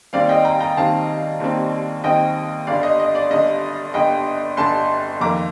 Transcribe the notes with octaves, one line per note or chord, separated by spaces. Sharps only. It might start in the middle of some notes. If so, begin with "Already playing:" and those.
D#2 D#3 G3 C4 D5 F5
D#5 G5
G5 A#5
G5 A#5
D#2 D#3 G3 C4 F5 A5
D#2 D#3 G3 C4
D#2 D#3 G3 C4 D#5 G5
G1 G2 D3 D5 F5
D#5
D#5
D5
G1 G2 D3 D#5
G1 G2 D3 D#5 G5
G1 G2 D3 A5 C6
F2 D#3 A#3 A#5 D6